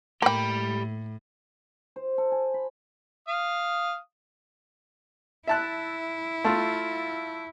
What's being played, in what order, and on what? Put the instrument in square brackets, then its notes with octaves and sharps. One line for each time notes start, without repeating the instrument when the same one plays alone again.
[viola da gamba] A2 [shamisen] A#3 G5 [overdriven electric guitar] G4 B5
[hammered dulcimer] C5
A4
G#5
B5
[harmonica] F5 D#6
[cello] E4 [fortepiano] E5 A5 F#6
[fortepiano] A3 F4